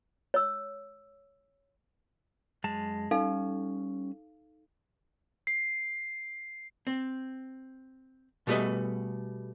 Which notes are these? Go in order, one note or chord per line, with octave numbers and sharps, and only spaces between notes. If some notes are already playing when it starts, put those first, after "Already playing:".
C#5 E6
F#2 G#3 A5
G3 C#4 D#4 A4 F5
C7
C4
B2 G3 A3 G#4 B4 D#5